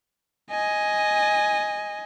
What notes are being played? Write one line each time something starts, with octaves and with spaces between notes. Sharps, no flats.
D#5 G#5